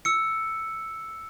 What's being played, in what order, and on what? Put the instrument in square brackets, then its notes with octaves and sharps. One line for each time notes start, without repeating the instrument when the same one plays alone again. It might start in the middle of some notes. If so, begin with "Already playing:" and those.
[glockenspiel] E6 C#7